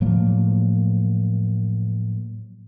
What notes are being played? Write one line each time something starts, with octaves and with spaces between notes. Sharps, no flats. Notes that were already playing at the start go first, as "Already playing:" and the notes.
A2 F3 F#3 A#3